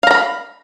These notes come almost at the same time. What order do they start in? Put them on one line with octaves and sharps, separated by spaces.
F5 A#5 B5